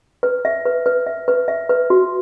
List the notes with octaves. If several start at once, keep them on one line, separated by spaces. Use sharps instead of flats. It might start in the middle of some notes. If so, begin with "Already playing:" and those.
B4
E5
B4
B4
E5
B4
E5
B4
F#4